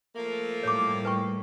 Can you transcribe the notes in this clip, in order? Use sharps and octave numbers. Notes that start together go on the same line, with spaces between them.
F3 A3 A#3
A2 G3 C#5 D6
B4 G5 C#6